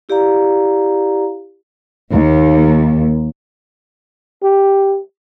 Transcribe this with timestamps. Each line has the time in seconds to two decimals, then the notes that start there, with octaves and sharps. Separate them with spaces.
0.09 E4 G4 D5 F5 A#5
2.12 D#2
4.43 G4